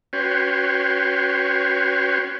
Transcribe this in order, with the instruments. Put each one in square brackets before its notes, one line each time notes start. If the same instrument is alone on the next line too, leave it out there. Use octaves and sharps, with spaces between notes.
[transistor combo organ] C#4 F#4 B4 C#5 G5 C6